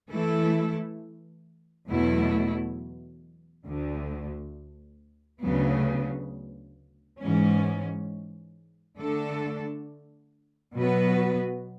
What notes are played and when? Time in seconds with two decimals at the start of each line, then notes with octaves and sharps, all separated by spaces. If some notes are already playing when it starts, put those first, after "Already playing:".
0.10 E3 A3 E4 A4
1.88 E2 B2 F#3 A3 E4
3.65 D2 D3 A3
5.42 D2 C#3 F#3 B3
7.20 G#2 E3 G#3 C#4
8.97 D3 A3 D4 A4
10.74 B2 F#3 B3 F#4 B4